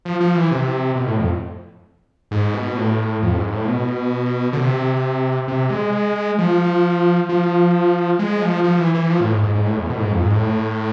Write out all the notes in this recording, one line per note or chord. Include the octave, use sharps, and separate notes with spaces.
F3
F3
E3
C3
B2
A2
F2
G#2
B2
A2
F2
G#2
A2
B2
D3
C3
C3
G#3
F3
F3
G#3
F3
F3
E3
E3
F3
A2
G#2
G#2
G#2
A2
E2
B2
A2
G#2
F2
G#2
A2